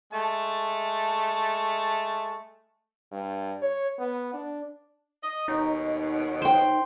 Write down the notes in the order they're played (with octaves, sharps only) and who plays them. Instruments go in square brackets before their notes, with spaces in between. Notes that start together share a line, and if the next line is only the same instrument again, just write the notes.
[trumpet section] G#3 A3 A5
[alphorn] G2
C#5
B3
D4
[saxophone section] D#5
[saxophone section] D#2 B2 C#5 [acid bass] D#4
[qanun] C5 G5